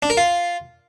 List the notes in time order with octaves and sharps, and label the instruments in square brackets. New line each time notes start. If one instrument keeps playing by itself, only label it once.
[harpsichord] D4
A#4
F4